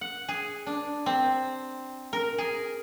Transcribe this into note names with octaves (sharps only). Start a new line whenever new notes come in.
F#5
G#4
D4
C4
A#4
G#4